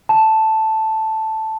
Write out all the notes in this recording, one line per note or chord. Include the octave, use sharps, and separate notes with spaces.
A5